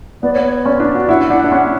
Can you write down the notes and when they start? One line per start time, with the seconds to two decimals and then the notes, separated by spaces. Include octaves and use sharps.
0.23 B3 D5
0.34 C#5
0.44 C#5
0.55 C#5
0.65 C#4 D5
0.80 D4
0.95 F#4
1.08 E4 F#5
1.30 D4 F#5
1.44 D4
1.50 C#4 F#5